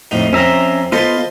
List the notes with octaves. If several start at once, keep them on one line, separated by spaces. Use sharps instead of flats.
F2 A2 D#4
F2 C4 C#4 E5 A#5
B3 F4 A4 C5 D#5